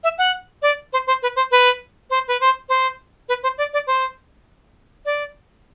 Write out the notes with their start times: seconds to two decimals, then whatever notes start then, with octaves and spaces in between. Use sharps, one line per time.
0.04 E5
0.18 F#5
0.62 D5
0.93 C5
1.07 C5
1.23 B4
1.36 C5
1.51 B4
2.10 C5
2.28 B4
2.41 C5
2.69 C5
3.29 B4
3.43 C5
3.58 D5
3.73 D5
3.87 C5
5.06 D5